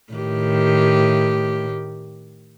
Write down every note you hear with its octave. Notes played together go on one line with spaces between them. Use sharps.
A2 D#3 G4